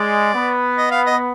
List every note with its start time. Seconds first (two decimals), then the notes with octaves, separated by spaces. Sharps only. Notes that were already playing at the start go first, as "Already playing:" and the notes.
Already playing: G#3 D5
0.34 B3
0.78 D#5
0.91 F5
1.07 D#5